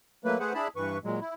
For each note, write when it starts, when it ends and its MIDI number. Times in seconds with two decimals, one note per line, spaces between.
0.25 0.38 54
0.25 0.38 57
0.25 0.38 58
0.25 0.38 71
0.40 0.53 57
0.40 0.53 68
0.40 0.53 71
0.40 0.53 72
0.40 0.53 78
0.54 0.68 62
0.54 0.68 64
0.54 0.68 68
0.54 0.68 81
0.54 0.68 83
0.76 0.98 43
0.76 0.98 52
0.76 0.98 71
0.76 0.98 85
1.04 1.20 46
1.04 1.20 54
1.04 1.20 56
1.21 1.34 64